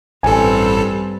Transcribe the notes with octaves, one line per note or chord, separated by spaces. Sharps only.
A1 G2 G3 C4 A4 G#5